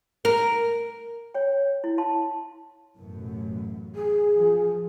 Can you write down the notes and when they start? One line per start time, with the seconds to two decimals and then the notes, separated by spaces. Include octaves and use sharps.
0.25 A#4
1.34 C#5 G5
1.84 E4
1.98 F5 A5 C6
2.97 A1 F#2 B2
3.95 G#4
4.37 F3